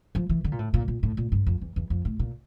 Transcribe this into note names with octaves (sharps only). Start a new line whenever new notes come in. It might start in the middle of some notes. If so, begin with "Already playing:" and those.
F3
E3
D3
A#2
A2
A#2
A#2
A2
A#2
G2
F2
E2
E2
F2
A2
A#2